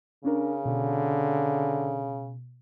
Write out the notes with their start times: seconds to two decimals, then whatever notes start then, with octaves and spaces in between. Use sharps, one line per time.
0.24 C#3 C#4 D4 A#4
0.65 B2 D3